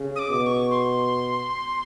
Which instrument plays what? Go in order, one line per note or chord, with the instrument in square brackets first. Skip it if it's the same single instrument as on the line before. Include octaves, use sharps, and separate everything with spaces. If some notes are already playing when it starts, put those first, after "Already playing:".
Already playing: [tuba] C#3
[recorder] D#6
D6
[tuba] B2
[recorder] D6
C#6
C6